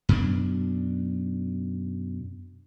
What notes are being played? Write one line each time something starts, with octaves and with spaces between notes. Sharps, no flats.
F#2 B2 D4